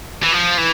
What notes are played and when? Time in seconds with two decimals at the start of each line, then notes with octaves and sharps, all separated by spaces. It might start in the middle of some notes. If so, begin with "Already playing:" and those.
0.23 E3
0.33 F3
0.58 E3